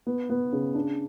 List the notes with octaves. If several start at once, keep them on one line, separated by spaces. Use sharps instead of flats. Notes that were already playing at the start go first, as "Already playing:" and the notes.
B3
B3
C#3
D4